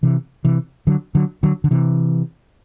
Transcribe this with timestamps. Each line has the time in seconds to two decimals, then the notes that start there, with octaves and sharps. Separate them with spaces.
0.03 C3 E3
0.45 C3 E3
0.87 D3 F#3
1.15 D3 F#3
1.43 D3 F#3
1.64 D3
1.71 C3 E3